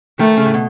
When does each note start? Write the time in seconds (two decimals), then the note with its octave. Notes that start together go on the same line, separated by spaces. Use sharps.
0.19 D#3 A3
0.37 C#3
0.46 A2
0.54 B2